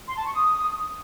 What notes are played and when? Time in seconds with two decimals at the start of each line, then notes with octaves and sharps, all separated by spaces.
0.07 C6
0.16 A5
0.25 C#6
0.34 D#6